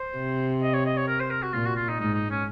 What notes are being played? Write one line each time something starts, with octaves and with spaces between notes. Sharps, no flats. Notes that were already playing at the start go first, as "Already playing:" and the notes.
Already playing: C5
C3
D#5
C#5
D#5
C#5
A#4
C5
A#4
F#4
A#2 F4
F#4
F4
D#4
G#2 D#4
D#4
C#4